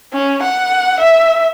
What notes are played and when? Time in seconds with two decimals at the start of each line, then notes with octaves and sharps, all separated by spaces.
0.13 C#4
0.43 F#5
1.00 E5